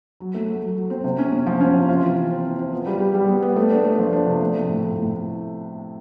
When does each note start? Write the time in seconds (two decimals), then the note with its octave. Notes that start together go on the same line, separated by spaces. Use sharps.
0.20 F#3
0.34 A3
0.48 F#3
0.62 F#3
0.76 F#3
0.90 C4
1.04 C3
1.18 C#4
1.32 C#4
1.46 F3
1.61 C#4
1.74 C3
1.88 F4
2.02 E3
2.16 E3
2.31 C4
2.45 C4
2.59 F4
2.72 B3
2.87 G3
3.00 G4
3.14 G3
3.28 B3
3.42 B3
3.56 A3
3.70 D4
3.84 A3
3.98 F3
4.13 D4
4.26 C3
4.40 A3
4.55 F3
4.69 A2
4.83 A2
4.96 A2